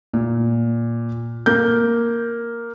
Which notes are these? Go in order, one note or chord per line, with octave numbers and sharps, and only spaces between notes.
A#2
A#3 G6